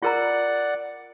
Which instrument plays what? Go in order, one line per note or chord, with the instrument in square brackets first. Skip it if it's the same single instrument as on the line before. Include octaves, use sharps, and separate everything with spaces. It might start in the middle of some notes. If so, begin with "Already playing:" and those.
[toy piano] F4 A#4 A#5 [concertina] D5 F#5